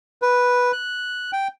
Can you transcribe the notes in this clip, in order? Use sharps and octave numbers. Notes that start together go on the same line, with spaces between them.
B4
F#6
G5